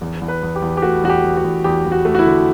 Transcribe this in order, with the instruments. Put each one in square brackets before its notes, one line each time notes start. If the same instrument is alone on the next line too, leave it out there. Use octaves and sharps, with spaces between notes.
[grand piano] E2
E2
B4
E2
G4
E2
G4
A3 F#4
E2 F#4
G4
E2
F#4
E2
E2 G4
E2
F#4
A3
F#4
E4
D3